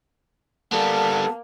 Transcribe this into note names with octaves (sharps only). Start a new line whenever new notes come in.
G3 A#3 B3 A4 A5